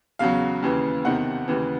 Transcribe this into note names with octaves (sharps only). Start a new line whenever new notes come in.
E2 C#3 F#3 F5
D#2 C#3 E3
E2 C3 D#3 F#5
D#2 C#3 E3